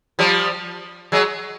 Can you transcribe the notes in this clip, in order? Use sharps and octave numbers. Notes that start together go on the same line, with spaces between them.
F3 G3
F#3 G#3